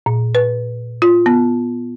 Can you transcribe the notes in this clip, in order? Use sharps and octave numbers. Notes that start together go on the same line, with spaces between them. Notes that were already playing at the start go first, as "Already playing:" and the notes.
A#2
B4
F4
B3